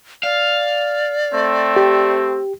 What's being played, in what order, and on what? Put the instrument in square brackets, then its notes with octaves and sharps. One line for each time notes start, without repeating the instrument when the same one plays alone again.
[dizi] D5 [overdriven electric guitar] F5
[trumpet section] A3 C4
[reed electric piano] G4